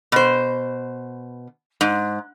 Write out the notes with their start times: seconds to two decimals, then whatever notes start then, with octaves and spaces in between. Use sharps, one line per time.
0.12 B2 C5
1.81 G#2